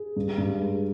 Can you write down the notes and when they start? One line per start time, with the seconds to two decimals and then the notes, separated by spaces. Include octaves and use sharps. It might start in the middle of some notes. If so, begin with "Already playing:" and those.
Already playing: G#4
0.16 G2
0.38 G2
0.61 G#3